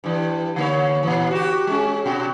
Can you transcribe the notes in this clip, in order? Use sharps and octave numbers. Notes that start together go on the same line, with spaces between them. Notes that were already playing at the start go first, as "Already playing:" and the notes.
G2 E3
D3 A#3 C#5
A#2 E3
F#4 G4
G#3 C#4
B2 F#4